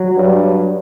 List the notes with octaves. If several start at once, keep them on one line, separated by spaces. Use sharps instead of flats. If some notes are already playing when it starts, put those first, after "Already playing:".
Already playing: F#3
G2